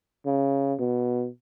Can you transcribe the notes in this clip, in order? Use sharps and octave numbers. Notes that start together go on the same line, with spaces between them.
C#3
B2